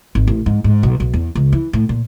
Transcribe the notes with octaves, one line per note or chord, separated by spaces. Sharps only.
G#1
A1
G#2
G#2
B1
B1
E2
C#2
E3
A2
A#2